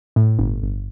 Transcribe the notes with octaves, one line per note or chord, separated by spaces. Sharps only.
A2
G1
G1